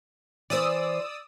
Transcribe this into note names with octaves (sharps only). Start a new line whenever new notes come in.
E3 C5 D5 D#6 E6